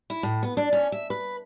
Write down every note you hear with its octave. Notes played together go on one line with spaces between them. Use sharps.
E4
A2
B3
D4
C#4
E5
B4